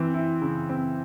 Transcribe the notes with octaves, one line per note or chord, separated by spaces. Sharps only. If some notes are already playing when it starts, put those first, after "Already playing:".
Already playing: E3 C4
E4
C#3
C4